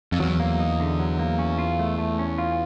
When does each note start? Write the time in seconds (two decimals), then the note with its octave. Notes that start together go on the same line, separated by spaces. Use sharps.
0.12 F2
0.20 E2 F#3
0.40 A#3
0.59 D#4
0.80 D3
1.00 F#3
1.19 A#3
1.39 C#4
1.59 F4
1.79 A3
1.98 A3
2.19 C#4
2.38 F4